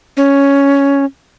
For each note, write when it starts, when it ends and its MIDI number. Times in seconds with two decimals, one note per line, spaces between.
0.17 1.05 61